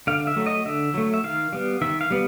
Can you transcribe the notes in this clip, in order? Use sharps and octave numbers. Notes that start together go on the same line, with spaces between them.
D3 F5
E5
F#3 A3
D#5
D3 E5
F#3 A3
E5
D#3 F5
G3 B3
D#3 E5
F5
G3 B3